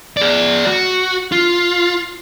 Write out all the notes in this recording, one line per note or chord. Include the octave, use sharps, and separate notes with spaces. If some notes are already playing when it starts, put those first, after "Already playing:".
G#4 D5
F#4
F4